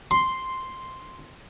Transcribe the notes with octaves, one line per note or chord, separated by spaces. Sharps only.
C6